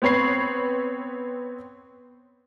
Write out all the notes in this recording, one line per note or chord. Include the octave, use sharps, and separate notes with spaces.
B3 C4 C#5 B5 C7